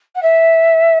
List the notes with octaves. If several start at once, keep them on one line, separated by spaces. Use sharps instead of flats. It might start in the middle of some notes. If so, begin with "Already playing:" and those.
F#5
E5